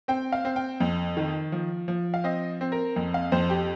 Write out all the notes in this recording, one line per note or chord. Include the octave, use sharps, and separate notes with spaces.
C4 G5
F5
C4
G5
F2
D#3
F3
F3
F5
C4 D#5
C4
A#4
F2
F5
F2 C5
G4